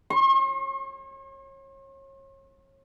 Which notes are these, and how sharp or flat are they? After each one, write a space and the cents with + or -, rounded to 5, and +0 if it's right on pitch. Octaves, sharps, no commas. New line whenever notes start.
C#5 -30 C6 +45